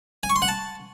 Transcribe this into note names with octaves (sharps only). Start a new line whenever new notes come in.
G#5
C#6
C6
F#5
A5